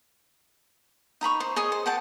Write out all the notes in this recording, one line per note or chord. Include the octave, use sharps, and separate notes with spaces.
D#4 A#5 B5 C#6
C5
G#4 C#5 D#5
C5
F#5 G5 A5